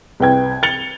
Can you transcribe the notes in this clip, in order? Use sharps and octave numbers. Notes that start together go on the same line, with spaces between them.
C2 B4 G5 G#6
A6 C#7 F7 G7